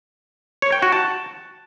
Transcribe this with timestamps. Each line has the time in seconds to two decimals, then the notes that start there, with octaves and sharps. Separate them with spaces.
0.62 C#5
0.72 G5
0.82 F#4
0.92 A5